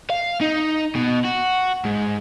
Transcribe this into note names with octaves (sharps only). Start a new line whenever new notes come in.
F5
D#4
B2
F#4
G#2